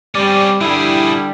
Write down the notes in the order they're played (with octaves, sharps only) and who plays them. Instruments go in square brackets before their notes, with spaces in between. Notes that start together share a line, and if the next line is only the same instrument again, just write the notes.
[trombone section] G3 [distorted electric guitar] C4 C#4 [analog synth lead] D5
[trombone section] D3 G3 [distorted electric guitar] D4 G#4 [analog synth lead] E4